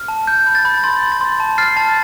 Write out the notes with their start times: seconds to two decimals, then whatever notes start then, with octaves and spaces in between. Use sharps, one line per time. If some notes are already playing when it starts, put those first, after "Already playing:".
Already playing: F6
0.08 A5
0.27 G6
0.47 B5
0.55 A6
0.65 B5
0.84 C6 A6
1.03 C6
1.12 A6
1.21 C6
1.40 A5
1.58 F6 A6 C7
1.77 A5 A6